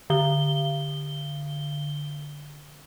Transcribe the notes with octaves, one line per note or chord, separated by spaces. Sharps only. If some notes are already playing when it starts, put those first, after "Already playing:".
D3 G7